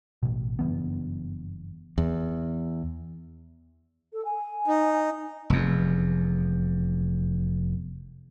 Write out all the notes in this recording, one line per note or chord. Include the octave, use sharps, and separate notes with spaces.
A1 B2
F#1 G2 E3 B3
E2
A4
G#5
D#4
F1 E2